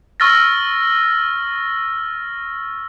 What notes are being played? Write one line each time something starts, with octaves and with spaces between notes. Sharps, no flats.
C#6 E6 F6 A6 A#6